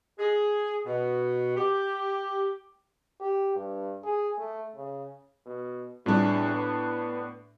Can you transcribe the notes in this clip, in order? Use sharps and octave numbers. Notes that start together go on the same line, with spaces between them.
G#4
B2
G4
G4
G2
G#4
A3
C#3
B2
E2 A2 G3 C4 D4 F4
B3